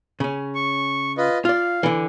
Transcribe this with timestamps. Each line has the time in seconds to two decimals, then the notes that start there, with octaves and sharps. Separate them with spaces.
0.20 C#3 C#4
0.55 C#6
1.18 F4 B4 D#5
1.45 F4 D5 F5
1.83 D3 E3